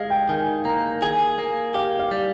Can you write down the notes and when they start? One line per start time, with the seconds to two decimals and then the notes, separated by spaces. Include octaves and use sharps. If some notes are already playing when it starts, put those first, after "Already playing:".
Already playing: G#3 G#4 D#5 F5
0.10 G5
0.29 D#3 G#5
0.65 A#3 A#5
1.02 G#4 G#5
1.39 A#3
1.74 G4 F5
1.99 F5
2.11 G3